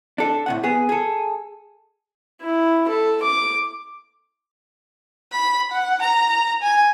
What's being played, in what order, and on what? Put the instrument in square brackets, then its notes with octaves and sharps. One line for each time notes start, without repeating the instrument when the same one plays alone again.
[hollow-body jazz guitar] D4 A4
A2 C3 F#5
B3 G#4
G#4 A4
[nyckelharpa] E4
A4
D6
[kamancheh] B5
F#5
A#5
G#5